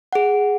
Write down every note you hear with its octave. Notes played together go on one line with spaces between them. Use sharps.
G#4 F#5